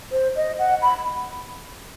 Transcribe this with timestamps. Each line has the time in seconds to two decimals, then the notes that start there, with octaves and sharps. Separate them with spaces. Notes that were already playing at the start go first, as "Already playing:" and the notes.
0.12 C5
0.36 D#5
0.59 F#5
0.82 B5